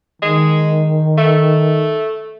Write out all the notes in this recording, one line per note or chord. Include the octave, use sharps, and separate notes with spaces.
D#3 G#3
A3